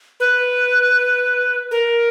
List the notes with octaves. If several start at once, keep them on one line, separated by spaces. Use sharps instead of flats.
B4
A#4